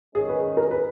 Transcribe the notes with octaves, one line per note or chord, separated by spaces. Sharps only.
D#3 G#3 C#4 G#4
B4
A#4
B4